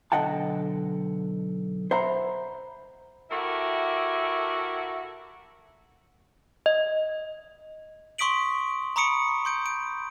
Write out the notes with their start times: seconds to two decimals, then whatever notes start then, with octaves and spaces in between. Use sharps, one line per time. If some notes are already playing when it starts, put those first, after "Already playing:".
0.12 B1 D3 D#5 F#5 G5 A5
1.91 C5 E5 F#5 A#5 B5
3.31 E4 F#4 G4 A4 A#4 E5
6.66 D#5
8.18 C6 C#6 D#6 B6 D7 F#7
8.96 A#5 B5 C#6 D#6 C#7 D7
9.45 C6 G6 D7
9.66 D7